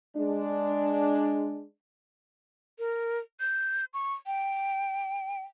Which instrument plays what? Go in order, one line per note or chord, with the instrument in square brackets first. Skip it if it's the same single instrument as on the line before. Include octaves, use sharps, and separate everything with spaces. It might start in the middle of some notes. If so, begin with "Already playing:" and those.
[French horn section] G#3 D4
[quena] A#4
G6
C#6
G5